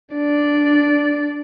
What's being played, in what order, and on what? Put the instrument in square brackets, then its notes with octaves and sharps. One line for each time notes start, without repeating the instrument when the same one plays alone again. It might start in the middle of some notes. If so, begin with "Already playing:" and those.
[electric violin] D4 D5